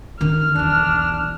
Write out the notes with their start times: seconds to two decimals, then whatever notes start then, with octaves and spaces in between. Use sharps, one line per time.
0.21 D#3 D#4 F6
0.56 B1 E2 D4